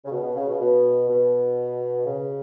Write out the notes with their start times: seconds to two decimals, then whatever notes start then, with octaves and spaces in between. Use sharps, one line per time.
0.05 C#3
0.11 B2
0.23 B2
0.35 C#3
0.49 B2
0.60 B2
1.09 B2
2.06 C#3